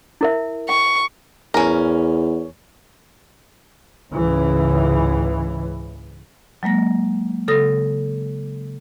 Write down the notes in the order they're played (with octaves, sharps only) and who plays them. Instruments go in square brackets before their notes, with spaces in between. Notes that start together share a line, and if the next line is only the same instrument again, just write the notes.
[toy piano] E4 A#4 E5
[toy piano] G5 [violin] C#6
[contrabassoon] E2 [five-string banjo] C#4 A#4
[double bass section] C#2 G#2 C#3 E3
[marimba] F#3 G#3 A#3 A#6
C#3 A4 D#6 A#6